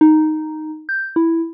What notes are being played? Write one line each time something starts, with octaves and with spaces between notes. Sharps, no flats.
D#4
G6
E4